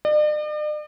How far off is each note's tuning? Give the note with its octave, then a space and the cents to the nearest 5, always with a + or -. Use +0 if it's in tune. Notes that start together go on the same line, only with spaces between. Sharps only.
D5 +45